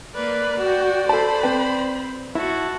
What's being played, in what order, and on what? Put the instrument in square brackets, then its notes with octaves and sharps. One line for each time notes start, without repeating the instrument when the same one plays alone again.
[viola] A#3 B4 [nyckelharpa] D5
[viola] F#4 G5
[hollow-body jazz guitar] A4 A5 [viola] C5 B5
[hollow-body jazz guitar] C4 B4 G5
[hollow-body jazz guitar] E4 [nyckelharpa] F#4 [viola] A5